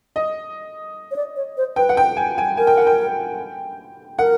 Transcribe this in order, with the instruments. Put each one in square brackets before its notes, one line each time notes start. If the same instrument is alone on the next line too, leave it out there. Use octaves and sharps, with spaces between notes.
[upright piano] D#5
[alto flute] C#5
D5
C#5
C5
[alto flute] B4 [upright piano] G5
[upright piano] F#5
G5
G#5
G#5
[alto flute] A#4 [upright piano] G#5
[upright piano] G5
F#5
G5
[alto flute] A#4 [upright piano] F#5